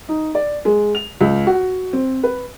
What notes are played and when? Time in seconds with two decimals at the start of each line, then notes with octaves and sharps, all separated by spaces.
0.09 D#4
0.35 D5
0.65 G#3
0.95 F7
1.21 C#2
1.47 F#4
1.93 C4
2.23 B4